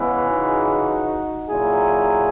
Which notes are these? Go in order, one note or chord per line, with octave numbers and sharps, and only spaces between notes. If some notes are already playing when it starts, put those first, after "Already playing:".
Already playing: C#3 E3 G#3 B3
D#4 F#4
A#2 F#3 E4 G#4